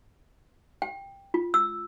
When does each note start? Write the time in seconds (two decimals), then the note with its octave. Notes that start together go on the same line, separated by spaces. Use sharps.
0.82 G5
1.34 F4
1.54 E6